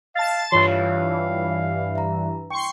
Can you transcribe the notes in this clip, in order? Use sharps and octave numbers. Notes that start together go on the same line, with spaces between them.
F5 A5 A6
G2 E3 F4 C#5 C6
F5
E5 A#5
G5 C6 C#6